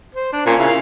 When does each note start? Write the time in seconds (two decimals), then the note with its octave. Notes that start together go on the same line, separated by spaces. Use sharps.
0.15 C5
0.33 D4
0.46 A#2 C#4
0.59 C#3 E4 F5